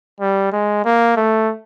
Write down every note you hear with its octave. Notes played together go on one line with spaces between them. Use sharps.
G3
G#3
A#3
A3